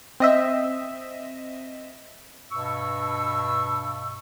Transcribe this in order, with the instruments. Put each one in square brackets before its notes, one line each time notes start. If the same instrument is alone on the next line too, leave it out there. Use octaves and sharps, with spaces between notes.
[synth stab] C4 D#5 E5
[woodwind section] G2 B2 C#6 E6